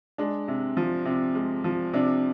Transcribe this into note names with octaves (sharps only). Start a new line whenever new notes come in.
G#3 D4
C3
F3
C3
G#3
F3
C3 D4